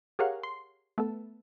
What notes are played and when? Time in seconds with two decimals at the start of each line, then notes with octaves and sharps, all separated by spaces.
0.19 G4 G#4 A#4 C#5 F5 F#5
0.43 C6
0.98 A3 B3 A4